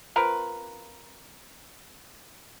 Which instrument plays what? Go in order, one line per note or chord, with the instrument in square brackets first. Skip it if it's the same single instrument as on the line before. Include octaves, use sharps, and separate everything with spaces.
[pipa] C4 F4 A#4 B4